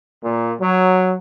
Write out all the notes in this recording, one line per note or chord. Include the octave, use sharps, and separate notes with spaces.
A#2
F#3